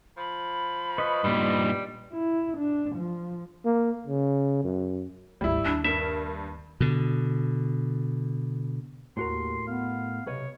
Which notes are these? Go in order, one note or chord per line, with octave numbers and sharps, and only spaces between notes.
F3 B5
B4 D#5 C#6
G2 A#2 G3
E4
D4
F3
A#3
C#3
F#2
G#1 D2 G3 E4
D#2 D4
G2 A#4 E5
B2 D3
D#2 A2 F#4 A#4 C6
B3 F5
B1 C3 B4 C#5 D#5